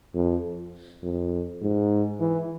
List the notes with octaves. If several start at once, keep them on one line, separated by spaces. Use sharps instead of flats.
F2
F2
G#2
E3